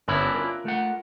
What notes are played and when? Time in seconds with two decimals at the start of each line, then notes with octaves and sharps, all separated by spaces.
0.08 G1 C#4 D4 E4 A#4 F#6
0.35 F4 A#4
0.65 A3 F#5